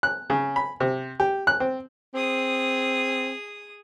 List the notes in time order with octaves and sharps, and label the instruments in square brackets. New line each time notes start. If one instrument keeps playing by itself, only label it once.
[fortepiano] F#6
C#3
B5
C3
G4
F#6
C4
[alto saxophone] C4 [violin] G#4 D#6